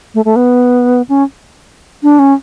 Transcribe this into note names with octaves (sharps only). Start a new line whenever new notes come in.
A3
A3
B3
C#4
D4
C#4